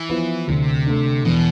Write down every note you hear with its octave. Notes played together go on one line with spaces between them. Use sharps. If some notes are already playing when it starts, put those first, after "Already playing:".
Already playing: E3
F3 B3 E4
D2 C3
D3 A3
E2 B2